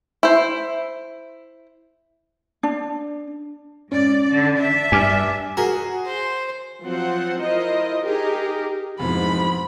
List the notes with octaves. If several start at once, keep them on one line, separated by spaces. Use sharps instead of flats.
E4 C5
D4
G#2 C#4 D5
D3
D4 E5
G2 G#5 D6 F6
F#4 G#4 A#4
C5
F3 F#3 C4 F4 C5 F#5
E4 F4 A#4 C5 D#5
D#4 G4 G#4 A#4
F1 G#2 B2 E3 F3 B5